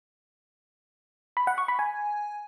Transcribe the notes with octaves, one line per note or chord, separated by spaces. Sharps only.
B5
F#5
C#6
B5
G#5